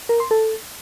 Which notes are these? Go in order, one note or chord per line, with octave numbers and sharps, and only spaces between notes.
A#4
C6
A4